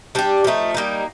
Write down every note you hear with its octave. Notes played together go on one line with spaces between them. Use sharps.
G3 D4 G4
F3 A3 D#4
G3 A#3 D#4